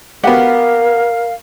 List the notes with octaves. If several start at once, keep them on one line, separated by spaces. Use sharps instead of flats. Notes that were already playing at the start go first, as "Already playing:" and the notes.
B3 F#4 G4 A#4 F5 F#5